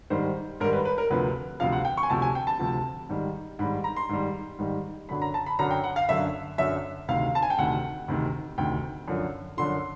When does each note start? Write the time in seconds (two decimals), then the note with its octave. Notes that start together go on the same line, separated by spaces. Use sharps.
0.10 G#2 D#3 G3 C5
0.60 G#2 D#3 G3 A#4
0.73 B4
0.85 B4
0.98 A#4
1.10 D2 C3 F3 B4
1.60 D2 C3 F3 F5
1.73 F#5
1.85 G5
1.97 C#6
2.03 G#5
2.10 D2 C3 F3 A5
2.22 G#5
2.35 G5
2.47 A5
2.59 D2 C3 F3
3.09 G#2 D#3 G3
3.59 G#2 D#3 G3 B5
3.84 A#5
3.96 C6
4.09 G#2 D#3 G3
4.59 G#2 D#3 G3
5.09 F#2 D3 F#3 B5
5.22 A#5
5.34 A5
5.46 B5
5.59 F#2 D3 F#3 A#5
5.71 G5
5.84 F#5
5.96 F5
6.09 F#2 D3 F#3 E5
6.58 F#2 D3 F#3 E5
7.08 D2 C3 D#3 F5
7.35 A5
7.42 G#5
7.50 G5
7.58 D2 C3 D#3 F#5
8.08 D2 C3 D#3
8.58 D2 C3 D#3 G5
9.08 F#2 D3 F3
9.57 F#2 D3 F3 C6